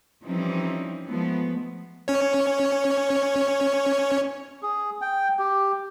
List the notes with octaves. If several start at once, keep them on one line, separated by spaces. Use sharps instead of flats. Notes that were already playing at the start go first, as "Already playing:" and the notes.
E3 F3 G3 C4 C#4 D#4
F3 G#3 A3 B3
C#4 C#5
G#4
G5
G4